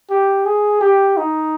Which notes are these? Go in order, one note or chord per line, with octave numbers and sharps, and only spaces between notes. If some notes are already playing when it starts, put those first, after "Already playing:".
G4
G#4
G4
D#4